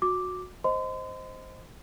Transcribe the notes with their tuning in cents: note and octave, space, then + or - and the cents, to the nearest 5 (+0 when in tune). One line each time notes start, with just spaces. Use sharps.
F#4 -20 D6 +0
C5 +0 D#5 +0 C6 -40